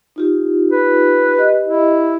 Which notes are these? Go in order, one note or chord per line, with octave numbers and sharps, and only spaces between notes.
D#4 F4 G4
B4
G4 D#5
E4